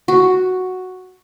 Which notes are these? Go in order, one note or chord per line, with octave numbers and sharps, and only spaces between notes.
F#4